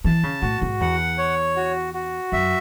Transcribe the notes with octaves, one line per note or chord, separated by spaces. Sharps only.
E3 A5
C#3
A2 F#4
G#2
E2 F#5
C#5
F#4
F#4
F#2 E5